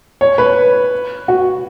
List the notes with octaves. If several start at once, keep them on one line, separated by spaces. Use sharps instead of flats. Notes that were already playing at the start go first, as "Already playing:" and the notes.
C#5
B4
F#4